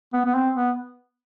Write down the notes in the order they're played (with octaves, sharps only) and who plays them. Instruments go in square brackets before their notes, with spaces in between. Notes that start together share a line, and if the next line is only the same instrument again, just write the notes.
[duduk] B3
B3
C4
B3